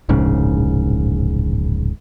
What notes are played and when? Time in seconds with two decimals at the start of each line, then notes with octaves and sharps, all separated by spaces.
0.09 D1 A#1 G#2 C#3